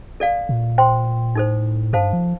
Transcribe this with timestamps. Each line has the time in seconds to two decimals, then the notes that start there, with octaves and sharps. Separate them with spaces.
0.20 A4 D5 F5
0.49 A#2
0.78 C5 G5 C6
1.35 A2 D#4 A4 C5
1.93 G2 A4 C5 F5 A5
2.13 F3